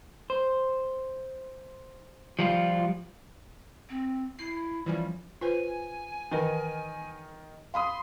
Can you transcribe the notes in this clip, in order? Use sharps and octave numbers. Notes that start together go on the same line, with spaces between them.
C5
F3 G3 F4
C4
E4 C7
E3 F3 G3 C#4
F4 B4 C5 G#5
D#3 E3 D#4 A#4 B4 D#5
F5 B5 C6 D#6